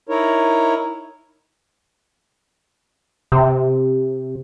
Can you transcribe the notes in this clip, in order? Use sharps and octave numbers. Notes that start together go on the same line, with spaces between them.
D#4 E4 A#4 C#5
C3